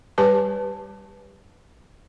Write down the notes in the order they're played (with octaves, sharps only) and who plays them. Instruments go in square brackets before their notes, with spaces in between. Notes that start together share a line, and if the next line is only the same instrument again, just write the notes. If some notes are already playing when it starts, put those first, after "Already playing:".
[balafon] G3 G4 B4 G#5 A5